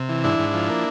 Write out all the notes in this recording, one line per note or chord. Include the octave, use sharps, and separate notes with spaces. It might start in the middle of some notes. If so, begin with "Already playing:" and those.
Already playing: C3
E3
G#2 D4 E4
G#2
F3
A#3